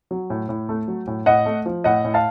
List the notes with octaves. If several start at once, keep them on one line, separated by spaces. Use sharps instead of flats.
F#3
A2
A2
A3
F#3
A2
A2 D#5 F#5
A3
F3
A2 D#5 F#5
A2
F5 A5